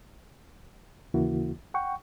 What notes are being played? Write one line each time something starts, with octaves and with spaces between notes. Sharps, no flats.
D#2 C#3 E3 A#3 E4 F#4
F#5 G5 C#6